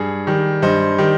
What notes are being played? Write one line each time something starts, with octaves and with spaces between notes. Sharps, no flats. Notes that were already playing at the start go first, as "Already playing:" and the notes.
Already playing: G2 G#4
D#3 G3
G2 C5 D#5
D#3 G3